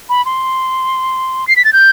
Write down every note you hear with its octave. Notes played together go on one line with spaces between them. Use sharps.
B5
C6
C7
B6
A6
G6